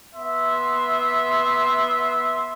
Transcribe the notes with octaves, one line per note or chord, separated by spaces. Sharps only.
B3 E5 C6